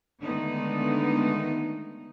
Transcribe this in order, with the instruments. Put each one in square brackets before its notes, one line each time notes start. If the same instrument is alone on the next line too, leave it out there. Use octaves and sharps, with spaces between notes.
[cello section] D3 D#3 G#3 A3 B3 D#4